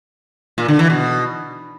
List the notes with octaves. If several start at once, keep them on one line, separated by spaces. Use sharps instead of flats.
A#2
D3
E3
B2